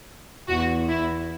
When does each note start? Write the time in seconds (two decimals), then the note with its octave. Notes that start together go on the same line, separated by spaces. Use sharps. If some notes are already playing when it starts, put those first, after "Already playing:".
0.48 E2 F#4
0.89 E4